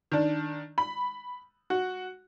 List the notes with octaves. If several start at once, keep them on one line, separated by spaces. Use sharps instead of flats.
D#3 D4
B5
F#4